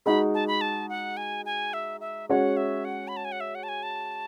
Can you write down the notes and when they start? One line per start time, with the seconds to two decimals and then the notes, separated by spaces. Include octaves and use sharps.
0.06 G#3 D#4 F#4 B5
0.34 A5
0.48 B5
0.61 A5
0.89 F#5
1.17 G#5
1.45 G#5
1.73 E5
2.01 E5
2.29 G#3 C#4 F#4 C#5 F#5
2.57 E5
2.85 F#5
3.08 B5
3.17 A5
3.25 G#5
3.32 F#5
3.40 E5
3.55 F#5
3.63 A5
3.69 G#5
3.83 A5